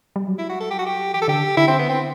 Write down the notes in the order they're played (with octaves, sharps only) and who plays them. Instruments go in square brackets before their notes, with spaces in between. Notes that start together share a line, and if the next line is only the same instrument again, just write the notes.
[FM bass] G3
F#3
[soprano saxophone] E4
F#4
A4
G4
F#4
G4
[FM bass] E3 [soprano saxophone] G4
[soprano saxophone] A4
[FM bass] D3 [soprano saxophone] G4
[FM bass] D3 [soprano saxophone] E4
[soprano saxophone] C4
B3
C4